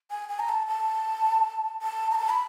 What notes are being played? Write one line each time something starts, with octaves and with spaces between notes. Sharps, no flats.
G#5
G#5
A#5
A5
A5
A5
A#5
A5
B5